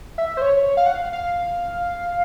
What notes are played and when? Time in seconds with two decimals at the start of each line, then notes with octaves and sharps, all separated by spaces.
0.18 E5
0.37 C5
0.42 C#5
0.77 F5
0.86 F#5
0.94 F5
1.13 F5